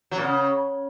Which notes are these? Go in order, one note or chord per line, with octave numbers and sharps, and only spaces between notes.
F#3
A#2
C#3